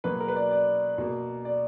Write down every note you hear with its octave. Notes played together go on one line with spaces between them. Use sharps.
B2 F#3 A#3 B4
A#4
B4
D5
D5
B2 A#3
D5